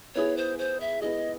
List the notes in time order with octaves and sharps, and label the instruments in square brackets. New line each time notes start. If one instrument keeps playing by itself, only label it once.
[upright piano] B3 E4 G#4 [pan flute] C#5
[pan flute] C5
C5
E5
[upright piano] B3 E4 G#4 [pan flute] D#5